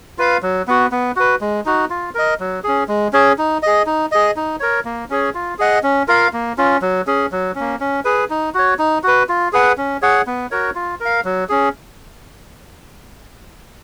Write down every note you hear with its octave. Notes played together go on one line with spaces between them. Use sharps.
F4 B4 F5
F#3
B3 F#4
B3
F#4 B4
G#3
D#4 F#4
F4
A#4 D#5
F#3
C#4 G#4
G#3
C#4 G#4 C#5
D#4
G#4 D#5
D#4
G#4 D#5
D#4
A#4 C#5
A#3
C#4 G#4 C#5
F4
G#4 D#5 F#5
C#4
F4 A#4 F5
A#3
C#4 F4
F#3
C#4 G#4
F#3
A#3 C#4
C#4
G#4 B4
D#4
F#4 C#5
D#4
F#4 B4
F4
G#4 B4 F#5
C#4
G#4 C#5 F#5
B3
F#4 A#4 C#5
F4
A#4 F5
F#3
C#4 G#4